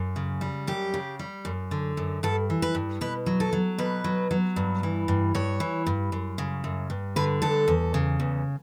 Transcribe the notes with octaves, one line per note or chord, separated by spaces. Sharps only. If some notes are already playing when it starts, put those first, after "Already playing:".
Already playing: F#2
C#3
G3
F#2 G4
C#3
G3
F#2
D3
F#2
G2 A4
E3
B4
G2
B2 B4
F#3
A4
F#3
B2 B4
F#3
F#3
G2
E3
G2
G2 C#5
E3
G2
F#2
C#3
F#2
G2
D3 B4
G2 A4
E2
C#3
E2